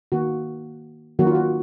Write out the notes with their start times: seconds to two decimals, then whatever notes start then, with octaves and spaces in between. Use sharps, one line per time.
0.12 D#3 A#3 F#4
1.19 D#3 F#3 A#3 F#4
1.27 F4
1.35 F#4